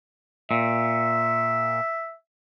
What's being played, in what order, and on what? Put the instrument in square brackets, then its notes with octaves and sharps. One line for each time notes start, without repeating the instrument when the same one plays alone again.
[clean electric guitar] A#2 [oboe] E5